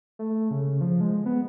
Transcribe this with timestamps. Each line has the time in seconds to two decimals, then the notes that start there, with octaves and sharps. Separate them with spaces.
0.19 A3
0.51 C#3
0.81 F3
1.01 G#3
1.26 B3